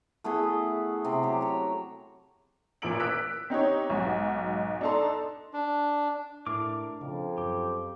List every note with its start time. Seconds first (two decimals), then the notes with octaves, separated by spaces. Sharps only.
0.24 A3 B3 E4 G#4
1.05 C3
1.23 F#3 G4
1.41 F#3 C#5
2.82 A1 A#2 A#4 E6 D7 F#7
3.00 E6 F#6 B6 D7
3.50 C4 D#4 G4 C#5
3.90 B1 G#2 F#4
4.81 D4 D#4 A4 A5 A#5 C6
5.53 D4
6.47 A2 D4 E4 A#4 D6
7.01 F2 C#3
7.38 F#2 G4